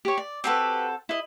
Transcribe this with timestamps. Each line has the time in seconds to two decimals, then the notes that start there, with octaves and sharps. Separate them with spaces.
0.05 G4 C#5
0.18 D5
0.44 C4 F#4 G4 A4 B4
1.09 E4 D#5